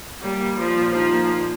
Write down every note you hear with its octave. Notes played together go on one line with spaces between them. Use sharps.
G3 A#3
A#3
F3 G3
A#2
F3 D#4
A#3
A#2